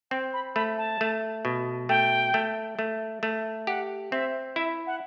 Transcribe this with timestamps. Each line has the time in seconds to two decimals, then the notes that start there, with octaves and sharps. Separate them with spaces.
0.11 C4 G5
0.33 B5
0.55 A3 B5
0.78 A5
1.01 A3
1.45 B2
1.89 A3 G5
2.34 A3
2.79 A3
3.23 A3
3.67 G4 F#5
4.11 C4 E5
4.56 E4 E5
4.87 F#5